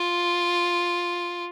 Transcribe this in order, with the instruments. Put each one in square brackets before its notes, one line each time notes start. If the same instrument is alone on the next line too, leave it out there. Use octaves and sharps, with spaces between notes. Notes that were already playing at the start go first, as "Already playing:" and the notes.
Already playing: [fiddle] F4